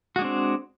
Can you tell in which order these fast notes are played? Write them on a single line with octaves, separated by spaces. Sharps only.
F#4 G#3 D4 C4